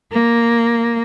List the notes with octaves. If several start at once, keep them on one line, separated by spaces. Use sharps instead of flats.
A#3